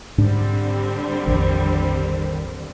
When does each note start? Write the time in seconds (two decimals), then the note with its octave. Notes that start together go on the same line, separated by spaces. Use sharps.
0.18 G#2 D3 G3 C4 D4
1.27 A#1 F2 D#3